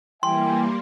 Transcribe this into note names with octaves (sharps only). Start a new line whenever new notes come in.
E3 G3 A#3 E5 G5 G#5 C6